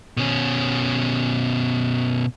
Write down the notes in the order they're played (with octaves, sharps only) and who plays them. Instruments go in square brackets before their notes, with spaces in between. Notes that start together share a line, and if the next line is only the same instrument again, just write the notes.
[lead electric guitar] B2 C#4